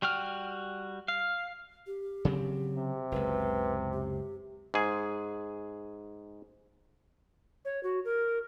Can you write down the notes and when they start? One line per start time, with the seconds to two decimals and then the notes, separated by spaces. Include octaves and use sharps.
0.02 G3 F#4 G5 F6
1.08 F5
1.87 G4
2.25 C#3 F#3 C4
2.76 C3
3.12 F#1 C#2 B4
3.93 G4
4.74 G#2 G#4
7.65 C#5
7.83 F#4
8.05 A#4